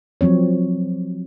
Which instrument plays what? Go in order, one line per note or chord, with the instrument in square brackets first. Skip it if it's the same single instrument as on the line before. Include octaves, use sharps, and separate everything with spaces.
[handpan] F3 F#3 C4 C#5